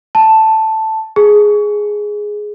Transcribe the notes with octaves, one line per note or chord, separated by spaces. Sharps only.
A5
G#4